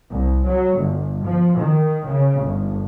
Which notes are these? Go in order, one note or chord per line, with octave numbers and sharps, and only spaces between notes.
C2
F#3
G1
F3
D#3
C#3
G1